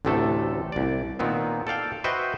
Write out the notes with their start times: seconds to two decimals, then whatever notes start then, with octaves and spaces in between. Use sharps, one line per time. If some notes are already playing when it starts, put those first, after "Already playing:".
0.05 A1 D2 C3 A3 A4
0.72 C2 D5
1.19 A#2 D#3 B3 C4
1.67 A4 D5 F5 G5
2.04 F#4 B4 C5 D#5 E5 G5